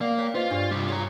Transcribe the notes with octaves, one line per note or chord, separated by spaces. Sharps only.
A#3 D5 F5 F#5
C#5 F5 G5 B6
F4 B4 C5 D#5
G2 D4 G4 D5
C3 G3
F4 G#4 C#5 G#5 A#5